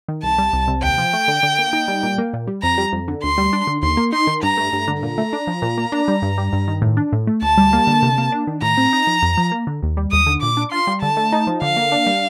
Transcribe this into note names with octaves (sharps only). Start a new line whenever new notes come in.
D#3
C2 A5
G3
C2
C3
D#2 G5
F3
A3
D3
D3
A#3
D#4
G3
A#2
A#3
A#2
G3
F2 A#5
G3
F2
D3
D2 C6
G3
D4
D3
D#2 C6
A#3
D#4 C6
D#3
G2 A#5
A3
G2
D3
A#2 A#5
A3
D4
F3
A#2
A#3
D4
G3
G2
G3
G2
D#3
A2
D4
A2
A3
D2 A5
G3
A#3
D3
C3
A#3
D4
D#3
A2 A#5
C4
D#4
F3
F2
F3
A#3
D3
D#2
G3
D#2 D#6
D3
A#2 D6
D4
F4 C6
G3
D3 A5
A3
D#4
F3
D3 F5
A#3
D4
G3